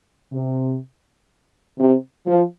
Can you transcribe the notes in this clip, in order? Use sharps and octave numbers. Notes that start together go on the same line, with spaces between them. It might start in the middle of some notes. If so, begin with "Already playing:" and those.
C3
C3
F3